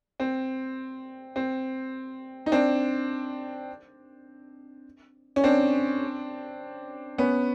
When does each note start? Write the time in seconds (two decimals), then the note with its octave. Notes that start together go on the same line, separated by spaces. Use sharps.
0.20 C4
1.36 C4
2.46 D#4
2.52 C4 D4
5.36 C#4
5.44 C4 D4
7.18 B3 C#4